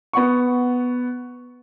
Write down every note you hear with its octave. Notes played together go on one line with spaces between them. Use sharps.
B3 F#5 C#6